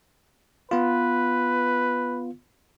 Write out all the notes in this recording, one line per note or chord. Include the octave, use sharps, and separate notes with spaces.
B3 F4 B4